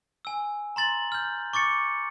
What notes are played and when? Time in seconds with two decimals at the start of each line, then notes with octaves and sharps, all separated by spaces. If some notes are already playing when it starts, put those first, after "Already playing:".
0.25 G#5 E6
0.76 A#5 C6 A6 F#7
1.12 F6 G6
1.53 C#6 D6 A6 C#7